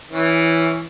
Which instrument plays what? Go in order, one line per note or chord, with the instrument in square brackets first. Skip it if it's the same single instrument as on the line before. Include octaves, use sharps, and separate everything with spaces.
[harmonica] E3 C#4